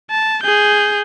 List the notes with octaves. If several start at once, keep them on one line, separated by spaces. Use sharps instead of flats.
A5
G#4 G6